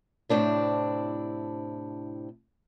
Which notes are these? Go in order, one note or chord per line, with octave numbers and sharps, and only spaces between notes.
A2 C3 C4 D4 E4